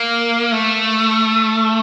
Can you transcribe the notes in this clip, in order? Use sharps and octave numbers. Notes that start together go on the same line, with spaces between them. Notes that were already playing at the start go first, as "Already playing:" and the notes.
Already playing: A#3
A3